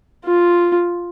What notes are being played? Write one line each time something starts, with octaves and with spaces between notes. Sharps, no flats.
F4